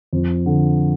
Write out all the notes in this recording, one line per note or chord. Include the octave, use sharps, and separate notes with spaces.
F2
D3